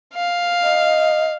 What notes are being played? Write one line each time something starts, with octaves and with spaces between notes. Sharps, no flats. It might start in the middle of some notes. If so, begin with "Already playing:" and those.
F5
D#5